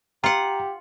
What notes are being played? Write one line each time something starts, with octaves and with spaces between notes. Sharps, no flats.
F4 G4 F#5 A#5